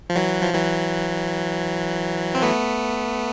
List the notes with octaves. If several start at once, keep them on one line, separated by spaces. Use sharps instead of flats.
F3
E3 F#3
F3
E3 F#3
C4
A3 B3